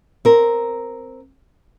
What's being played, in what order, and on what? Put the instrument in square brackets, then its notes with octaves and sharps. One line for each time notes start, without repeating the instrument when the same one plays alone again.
[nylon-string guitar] C4 A#4